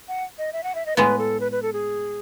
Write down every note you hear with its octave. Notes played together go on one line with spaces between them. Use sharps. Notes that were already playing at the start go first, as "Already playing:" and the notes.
F#5
D#5
E5
F#5
E5
D#5
A2 G#3 B3 B4
A4
B4
B4
A4
G#4